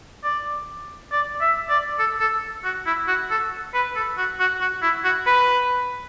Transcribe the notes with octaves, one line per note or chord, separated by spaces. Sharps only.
D5
D5
E5
D5
A4
A4
F#4
E4
F#4
A4
B4
A4
F#4
F#4
F#4
E4
F#4
B4